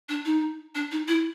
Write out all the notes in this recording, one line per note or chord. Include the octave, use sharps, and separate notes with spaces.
D4
D#4
D4
D#4
E4